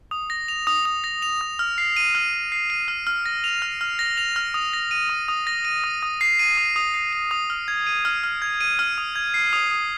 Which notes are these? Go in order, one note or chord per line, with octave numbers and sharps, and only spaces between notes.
D#6
A#6
F7
D#6
D#6
A#6
F7
D#6
F6
C7
D#7
F6
F6
C7
D#7
F6
F6
A#6
F7
F6
F6
A#6
F7
F6
D#6
A#6
D#7
D#6
D#6
A#6
D#7
D#6
D#6
C7
D#7
D#6
D#6
C7
D#7
D#6
F6
G#6
D#7
F6
F6
G#6
D#7
F6
D#6
G#6
C7
D#6
D#6